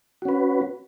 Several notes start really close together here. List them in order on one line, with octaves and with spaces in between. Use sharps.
F#4 C#4 B4